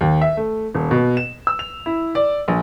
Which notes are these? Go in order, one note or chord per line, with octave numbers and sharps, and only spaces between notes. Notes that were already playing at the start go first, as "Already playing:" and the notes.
D#2
E5
A3
D#1
B2
E7
E6
F7
E4
D5
A#1